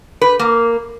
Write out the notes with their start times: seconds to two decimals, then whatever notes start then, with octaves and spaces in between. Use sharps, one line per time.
0.21 B4
0.39 A#3